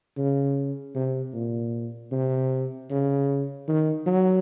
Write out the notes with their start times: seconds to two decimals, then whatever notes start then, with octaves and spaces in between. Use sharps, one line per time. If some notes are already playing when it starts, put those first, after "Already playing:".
0.17 C#3
0.95 C3
1.33 A#2
2.12 C3
2.90 C#3
3.68 D#3
4.07 F#3